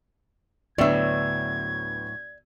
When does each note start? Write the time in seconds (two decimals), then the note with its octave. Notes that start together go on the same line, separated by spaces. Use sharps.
0.78 D2 A2 F#3 B3 D5 E5 E6 G#6